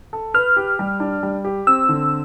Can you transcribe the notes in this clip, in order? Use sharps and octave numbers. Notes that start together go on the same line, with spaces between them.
A4
B4 F6
G4
G3
D4
G3
G4
C4 E6
D3